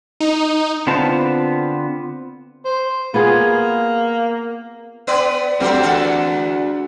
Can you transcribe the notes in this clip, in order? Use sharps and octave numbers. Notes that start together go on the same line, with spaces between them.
D#4
D3 B3 C4 F4 A5
C5
A#3 B3 F4 G#4
B3 B4 D5
F#3 C4 D4 F#4 G4 A4
E2 A4 D5 F#5